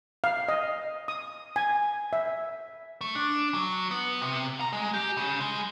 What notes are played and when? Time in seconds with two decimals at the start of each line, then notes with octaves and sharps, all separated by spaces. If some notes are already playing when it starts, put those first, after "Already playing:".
0.24 F5
0.48 D#5
1.08 D#6
1.56 G#5
2.13 E5
3.01 A3
3.15 D4
3.54 F#3
3.91 B3
4.22 C3
4.61 A#5
4.73 G#3
4.94 G4
5.17 C#3
5.40 G#3